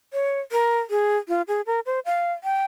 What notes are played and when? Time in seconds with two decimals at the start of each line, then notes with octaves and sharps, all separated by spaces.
0.13 C#5
0.52 A#4
0.90 G#4
1.28 F4
1.48 G#4
1.67 A#4
1.86 C5
2.05 F5
2.44 G5